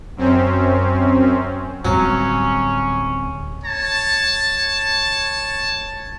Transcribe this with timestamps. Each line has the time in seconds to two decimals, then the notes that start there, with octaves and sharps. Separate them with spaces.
0.17 F#2 C4 C#4
1.85 D1 F#3 G3 C4 C#4
3.64 C#5 A5